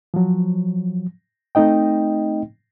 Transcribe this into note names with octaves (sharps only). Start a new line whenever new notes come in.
F3 F#3
A3 C4 D#4 D#5 G5